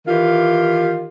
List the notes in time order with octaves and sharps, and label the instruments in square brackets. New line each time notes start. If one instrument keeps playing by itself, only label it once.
[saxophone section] D#3 E3 F4 G4